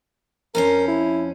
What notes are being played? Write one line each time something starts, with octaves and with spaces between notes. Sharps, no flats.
F2 C#4 A#4 C5
E4